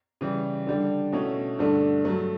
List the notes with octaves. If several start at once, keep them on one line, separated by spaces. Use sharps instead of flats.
C#3 E3 G3
D3 G3 D4
B2 A3 C#4 E4
G2 D3 A3 D4
G2 F#3 A3